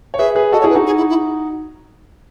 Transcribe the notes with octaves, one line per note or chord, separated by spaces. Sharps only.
C#5
G#4 B4 E5
G#4 B4
F#4 A4 D#5
C#5
E4 G#4
B4
D#4 F#4
G#4
E4
E4